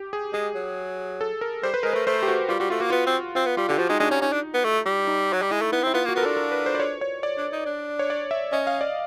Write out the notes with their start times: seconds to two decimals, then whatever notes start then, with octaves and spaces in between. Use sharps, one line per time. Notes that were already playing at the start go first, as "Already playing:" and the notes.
Already playing: G4
0.13 G#4
0.33 G#3 G#4
0.55 F#3
1.21 A4
1.41 A#4
1.63 G3 C5
1.74 B4
1.83 G#3 A#4
1.93 A3 B4
2.07 A3 C5
2.23 G4
2.28 F#4
2.49 G3 F4
2.60 G3 F#4
2.70 A3 F4
2.80 A#3 F#4
2.90 B3 F4
3.07 C4
3.35 C4 F4
3.46 B3
3.57 G3 F4
3.68 D3 G4
3.78 F3 F#4
3.89 G#3 D#4
4.00 G#3 D4
4.11 C#4 D4
4.22 C#4 D#4
4.32 D4
4.54 B3
4.65 A3
4.86 G3
5.07 D#4
5.33 F#3
5.42 G3
5.51 G#3 E4
5.62 A3
5.72 B3 E4
5.83 C4
5.87 E4
5.94 B3 F4
6.05 A#3
6.09 F#4
6.15 B3 A#4
6.23 D4 A4
6.37 A#4
6.52 B4
6.66 C5
6.75 D5
6.80 C#5
7.01 C#5
7.23 D5
7.37 D4
7.52 D#4
7.66 D4
7.99 C#5
8.10 D5
8.31 E5
8.53 C#4 D#5
8.67 F5
8.81 D5